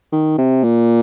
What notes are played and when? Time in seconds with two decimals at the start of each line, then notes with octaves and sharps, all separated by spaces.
0.13 D#3
0.38 C3
0.64 A#2